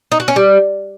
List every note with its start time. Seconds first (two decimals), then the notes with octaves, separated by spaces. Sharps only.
0.12 D#4
0.20 F#4
0.28 C#4
0.36 G3